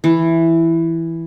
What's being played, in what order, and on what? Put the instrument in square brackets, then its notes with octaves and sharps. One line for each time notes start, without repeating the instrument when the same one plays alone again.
[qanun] E3